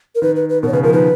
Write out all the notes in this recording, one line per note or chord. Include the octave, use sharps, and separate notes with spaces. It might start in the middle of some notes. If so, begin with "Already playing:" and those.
A#4
D#3 B4
B4
B4
B2 A#4
C#5
C#3 B4
F3 A#4
D#3 B4